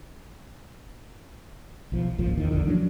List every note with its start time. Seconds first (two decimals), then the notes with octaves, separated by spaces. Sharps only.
1.92 B1 F3
2.18 G#1 C#2 A#2 F3
2.38 E2 D#3
2.52 A#1 E2 D3
2.67 F3 F#3 A3 D4